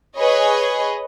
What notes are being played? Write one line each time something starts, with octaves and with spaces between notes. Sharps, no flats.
G#4 B4 C#5 D#5